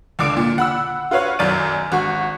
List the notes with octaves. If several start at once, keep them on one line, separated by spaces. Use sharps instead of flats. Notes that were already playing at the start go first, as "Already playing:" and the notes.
C#2 D3 D6 D7
A#2
F#5 B5 E6
F4 F#4 B4 C#5 F5
B1 F#2 D#3 D5 A6 D#7
G#1 F#4 C#6